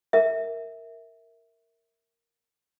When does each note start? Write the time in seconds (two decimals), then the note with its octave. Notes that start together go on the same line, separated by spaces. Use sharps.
0.13 A#4 E5